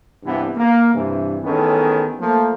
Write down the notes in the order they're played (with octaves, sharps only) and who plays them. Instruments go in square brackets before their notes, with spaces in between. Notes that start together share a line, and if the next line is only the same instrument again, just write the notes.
[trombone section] G2 C3 E3 B3 G4
A#3
G2 C3 E3
A1 D#3 B3 C#4 G#4 A4
F3 A3 A#3